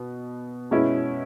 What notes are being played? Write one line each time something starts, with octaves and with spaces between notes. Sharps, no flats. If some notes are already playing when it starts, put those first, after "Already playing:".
Already playing: B2
B2 G#3 C#4 E4